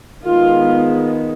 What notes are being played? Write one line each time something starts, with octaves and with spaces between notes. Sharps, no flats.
D#3 G#3 B3 F4